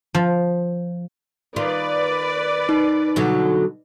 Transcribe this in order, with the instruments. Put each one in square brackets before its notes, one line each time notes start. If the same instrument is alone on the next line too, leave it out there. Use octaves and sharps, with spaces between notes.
[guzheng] F3
[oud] D#3 F4 [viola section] B4 D5
[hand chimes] D#4
[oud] B2 D3 F#3